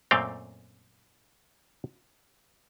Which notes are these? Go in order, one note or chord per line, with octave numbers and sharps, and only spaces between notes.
F#2 A#2 A3 C4 F5 G5